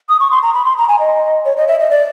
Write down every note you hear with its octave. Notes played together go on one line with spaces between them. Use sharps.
D#6
C#6
C6
A#5
B5
C6
A#5
G#5
D#5
C#5
D#5
E5
D#5
D5